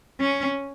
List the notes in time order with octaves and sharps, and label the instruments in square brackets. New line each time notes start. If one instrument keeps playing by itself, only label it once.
[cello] C#4